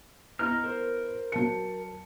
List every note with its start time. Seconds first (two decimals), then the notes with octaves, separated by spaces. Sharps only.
0.39 B3 E4 B4 D#5 A#5 F6
0.64 A#4 C5
1.32 F#3 A5 C#7